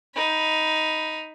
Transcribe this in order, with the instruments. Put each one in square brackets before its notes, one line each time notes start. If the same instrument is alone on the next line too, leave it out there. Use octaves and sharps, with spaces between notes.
[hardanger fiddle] D#4 B5